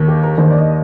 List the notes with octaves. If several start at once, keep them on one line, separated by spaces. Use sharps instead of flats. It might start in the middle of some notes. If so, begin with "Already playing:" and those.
Already playing: D#2 D#3
G4
A#4
D#2 D#3 C5
D5
D#5